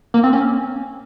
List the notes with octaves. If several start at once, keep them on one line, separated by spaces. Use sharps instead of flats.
A#3
C4
C#4